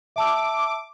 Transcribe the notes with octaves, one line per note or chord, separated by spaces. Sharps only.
E5 A5 D6 E6